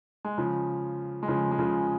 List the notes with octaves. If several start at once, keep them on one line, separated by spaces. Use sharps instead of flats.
G#3
C#3 F3
G#3
C#3 F3
G#3
C#3 F3